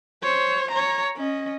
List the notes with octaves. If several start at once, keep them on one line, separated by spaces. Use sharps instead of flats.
C5 C#5
C#5 A#5
C#4 D#5